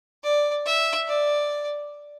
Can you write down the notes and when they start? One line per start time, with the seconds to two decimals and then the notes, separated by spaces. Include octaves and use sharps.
0.23 D5
0.65 E5
1.08 D5